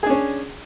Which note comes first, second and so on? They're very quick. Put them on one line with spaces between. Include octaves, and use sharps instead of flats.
G#4 D4 C#4